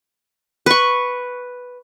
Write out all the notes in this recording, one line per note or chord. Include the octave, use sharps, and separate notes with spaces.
B4 C#6